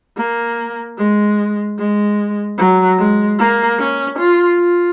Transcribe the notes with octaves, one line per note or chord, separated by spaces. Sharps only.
A#3
G#3
G#3
F#3
G#3
A#3
C#4
F4
F4